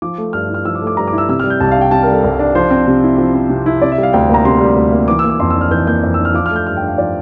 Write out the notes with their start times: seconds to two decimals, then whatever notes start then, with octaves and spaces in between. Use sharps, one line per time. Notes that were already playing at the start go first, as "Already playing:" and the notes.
0.02 F3 D6
0.18 A3
0.33 G2 F6
0.50 E4 F6
0.65 F3 E6
0.75 D6
0.81 A3
0.87 D6
0.97 G2 A#5
1.08 D6
1.13 E4
1.18 E6
1.29 C3 E6
1.40 F6
1.44 G3
1.50 G6
1.60 C2 A5
1.71 F5
1.76 D4
1.81 G5
1.91 C3 A5
2.03 A#4
2.08 G3 A4
2.23 C2 A#4
2.39 D4
2.55 F3 C5
2.71 C4
2.87 C3
3.03 E4
3.18 F3
3.34 C4
3.50 C3
3.66 E4
3.82 C3 D5
3.92 E5
3.98 G3 F5
4.13 D2 G5
4.30 A#3 A#5
4.45 C3 C6
4.61 G3
4.77 D2
4.92 A#3
5.08 E3 D6
5.19 E6
5.24 A#3
5.30 D6
5.40 F2 C6
5.50 E6
5.56 D4
5.61 F6
5.71 E3 G6
5.87 A#3 G6
6.03 F2
6.14 E6
6.19 D4
6.25 F6
6.34 F3 D6
6.46 F6
6.50 A3
6.56 G6
6.67 G2 F6
6.77 G5
6.82 D4
6.88 F5
6.98 F3 D5